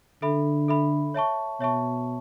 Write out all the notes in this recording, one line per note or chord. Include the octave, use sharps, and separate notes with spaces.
D3 A4 E5 B5
A4 E5 B5
C#5 E5 A5 C#6
B2 C#5 E5 A5 C#6